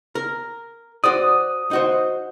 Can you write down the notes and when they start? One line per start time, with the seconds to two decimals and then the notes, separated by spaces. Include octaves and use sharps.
0.15 A#4
1.04 F#4 C5 D5 D#6
1.71 D#4 F#4 C5